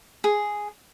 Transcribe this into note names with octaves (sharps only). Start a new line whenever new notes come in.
G#4